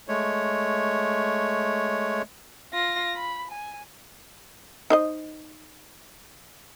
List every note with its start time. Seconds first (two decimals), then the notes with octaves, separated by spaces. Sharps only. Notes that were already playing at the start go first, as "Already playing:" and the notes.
0.08 G#3 A3 C#5
2.73 F4 A#6
3.16 B5
3.51 G#5
4.90 D#4 C5 D#5